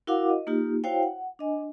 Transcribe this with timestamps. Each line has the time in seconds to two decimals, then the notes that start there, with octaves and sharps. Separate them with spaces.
0.07 E4 F#4 A#4 F5 F#5 D6
0.30 D#5
0.47 A#3 D#4 F4 G4
0.84 E4 F#4 C5 C#5 F5 G5
1.03 F#5
1.39 D4 D#5 G#5